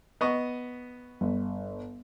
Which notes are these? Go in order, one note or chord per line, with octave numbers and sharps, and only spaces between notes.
B3 D#5 C#6
G1